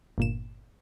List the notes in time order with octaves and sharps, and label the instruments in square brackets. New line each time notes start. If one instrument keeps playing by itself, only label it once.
[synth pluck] G1 A#2 E7